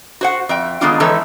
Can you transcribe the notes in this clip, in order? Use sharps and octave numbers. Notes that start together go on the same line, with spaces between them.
F#4 C5 F#5
F2 E5 G5
D#3 G#3 A3 B3 D4 F4
E3 G#3 D#4 A4 C#5 E5